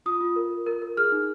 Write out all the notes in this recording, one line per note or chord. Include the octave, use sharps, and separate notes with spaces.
F4 D#6
F4
A#4
A#4
A#4
A#4
G#4 F6
D#4